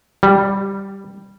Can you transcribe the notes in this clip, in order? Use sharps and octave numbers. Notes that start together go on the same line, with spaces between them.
G3